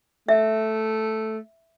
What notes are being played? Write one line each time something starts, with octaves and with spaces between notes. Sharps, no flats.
A3 E5